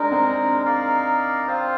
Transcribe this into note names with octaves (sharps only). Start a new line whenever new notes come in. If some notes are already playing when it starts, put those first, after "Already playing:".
Already playing: G#3 D4 D#4 A#4
C4
D4
D#4 A#4 D5 F5
C4 F4 C5 F5